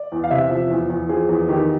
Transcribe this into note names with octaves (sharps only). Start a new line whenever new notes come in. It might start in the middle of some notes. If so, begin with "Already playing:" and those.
Already playing: D5
E2
F5
C3 E5
F3
E2
E2
F3 G#4
E2
D#3 G4